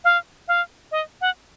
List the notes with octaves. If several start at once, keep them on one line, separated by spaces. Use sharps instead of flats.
F5
F5
D#5
F#5